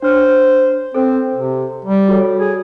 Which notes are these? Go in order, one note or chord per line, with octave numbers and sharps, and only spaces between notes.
D4 C5 C#5 F6
C4 A4 C5
C3
G3
F#4 A4 C#5
G#4